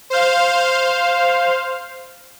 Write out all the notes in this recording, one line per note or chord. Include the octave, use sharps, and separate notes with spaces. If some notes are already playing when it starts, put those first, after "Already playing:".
C5 F5